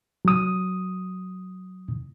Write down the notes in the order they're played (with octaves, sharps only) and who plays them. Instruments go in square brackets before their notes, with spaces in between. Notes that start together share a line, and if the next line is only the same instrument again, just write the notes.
[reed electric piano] F#3 D#6